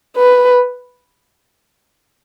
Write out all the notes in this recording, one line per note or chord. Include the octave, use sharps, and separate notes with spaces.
B4